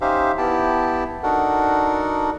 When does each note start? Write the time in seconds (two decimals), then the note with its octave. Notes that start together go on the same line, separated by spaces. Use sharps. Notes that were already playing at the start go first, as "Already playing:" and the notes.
0.01 C#4 D#4 G4 C5 E5 F5
0.38 B3 E4 G4 G5 A5
1.23 D4 D#4 F#4 A4 A#4 F#5